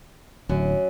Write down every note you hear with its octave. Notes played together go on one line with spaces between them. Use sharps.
D1 F#2